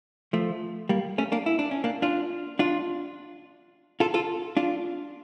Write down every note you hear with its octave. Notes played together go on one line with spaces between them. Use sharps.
F3 A3
G3 A#3
A3 C#4
A#3 D4
E4
D4
C#4
A#3 D4
D4 F4
D4 F4
F4 A4
F4 A4
D4 F4